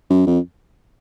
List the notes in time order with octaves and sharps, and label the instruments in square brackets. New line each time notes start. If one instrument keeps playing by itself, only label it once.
[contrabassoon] F#2
F2